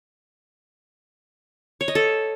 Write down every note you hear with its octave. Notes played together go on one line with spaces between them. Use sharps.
C#5
D#5
A4